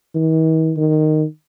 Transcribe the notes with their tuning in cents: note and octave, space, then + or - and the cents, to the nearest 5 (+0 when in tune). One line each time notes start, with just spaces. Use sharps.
D#3 +45
D#3 -10